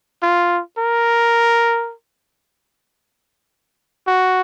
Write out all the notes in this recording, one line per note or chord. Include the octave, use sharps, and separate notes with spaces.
F4
A#4
F#4